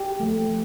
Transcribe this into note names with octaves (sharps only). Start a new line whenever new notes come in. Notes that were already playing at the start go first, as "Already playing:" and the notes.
Already playing: G4
F3 A3